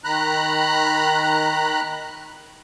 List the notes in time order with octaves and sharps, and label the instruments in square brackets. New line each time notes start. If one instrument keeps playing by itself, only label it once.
[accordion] D#3 A#5 B5 F#6